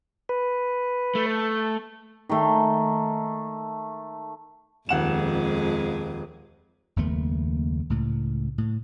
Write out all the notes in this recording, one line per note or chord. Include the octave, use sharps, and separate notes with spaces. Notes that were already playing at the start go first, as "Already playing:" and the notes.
B4
A3
D#3 A3
D#1 F2 G#3 F#5 E7
F#1 D#2 A3 B3
C#2 A2
A2